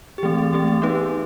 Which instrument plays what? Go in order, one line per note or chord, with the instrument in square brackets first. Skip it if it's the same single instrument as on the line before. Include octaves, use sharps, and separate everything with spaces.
[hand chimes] G4
[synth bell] E3 A3 C4 [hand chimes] G#4
[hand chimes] G#4
[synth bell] E3 A3 C4 [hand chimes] G4
[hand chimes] G#4
[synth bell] B3 D#4 G4 B4